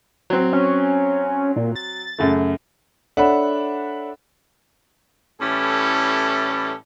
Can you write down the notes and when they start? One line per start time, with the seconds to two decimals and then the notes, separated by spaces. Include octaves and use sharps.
0.30 F#3 C4
0.53 C#4
1.56 A#2
1.76 A6
2.18 F#2 C#3 A3
3.17 D4 A4 C#5 E5 F#5 B5
5.41 A2 E3 G3 C#4 E4 A4